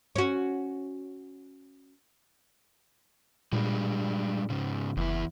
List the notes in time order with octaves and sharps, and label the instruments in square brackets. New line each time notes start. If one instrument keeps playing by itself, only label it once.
[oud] C#4 F#4
[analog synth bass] A#2 [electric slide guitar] G3 G#3 D4
[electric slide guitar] G#2 C#3
[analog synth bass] F#1 [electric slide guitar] E2 E4